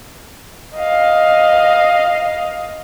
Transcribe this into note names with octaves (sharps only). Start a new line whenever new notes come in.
D#5 F5